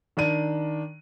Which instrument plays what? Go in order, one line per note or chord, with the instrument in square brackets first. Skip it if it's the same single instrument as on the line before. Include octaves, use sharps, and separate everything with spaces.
[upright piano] D#3 D4 D#7